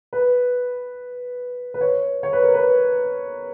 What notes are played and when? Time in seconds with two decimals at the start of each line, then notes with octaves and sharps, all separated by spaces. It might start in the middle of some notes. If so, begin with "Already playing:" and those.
0.13 B4
1.74 B4
1.81 C#5
2.23 C#5
2.33 B4
2.43 A#4
2.54 B4